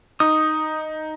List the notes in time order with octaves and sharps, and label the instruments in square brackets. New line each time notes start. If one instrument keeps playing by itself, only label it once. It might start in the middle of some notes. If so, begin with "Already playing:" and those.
[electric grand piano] D#4 [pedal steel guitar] D#6